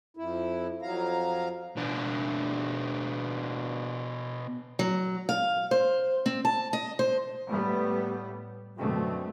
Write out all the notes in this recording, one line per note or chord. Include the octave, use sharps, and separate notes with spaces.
F2 E4
F2 F#3 F5 A#5
B2 D4
F#3
F5
C5
C4
A5
D#5
C5
A2 G3 A3 B3
F#2 B2 D3 A3 C4